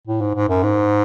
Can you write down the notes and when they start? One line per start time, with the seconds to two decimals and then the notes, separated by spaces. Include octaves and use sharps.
0.07 A2
0.21 G#2
0.35 G#2
0.49 F#2
0.63 G#2